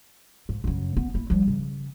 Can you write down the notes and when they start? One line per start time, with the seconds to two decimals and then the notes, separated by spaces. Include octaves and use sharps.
0.49 G#2
0.64 F#2 C#3
0.97 B3
1.14 A#3 E4
1.30 F3 G3
1.48 C#3